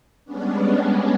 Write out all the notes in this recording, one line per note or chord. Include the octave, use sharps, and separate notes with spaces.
G3 G#3 B3 C#4 D4